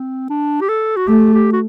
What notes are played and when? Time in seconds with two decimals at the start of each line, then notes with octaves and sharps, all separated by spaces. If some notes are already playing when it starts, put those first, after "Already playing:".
Already playing: C4
0.30 D4
0.61 G4
0.69 A4
0.97 F#4
1.08 A3 G4
1.34 G4
1.53 F#4